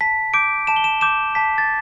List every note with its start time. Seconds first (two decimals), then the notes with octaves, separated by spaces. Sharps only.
0.01 A5 B6
0.34 D6 G6 D7
0.67 A5 E7
0.76 G7
0.84 E7
1.01 D6 G6 E7
1.35 A5 B6
1.58 A6